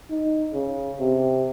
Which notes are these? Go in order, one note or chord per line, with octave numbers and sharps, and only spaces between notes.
D#4
C#3
C3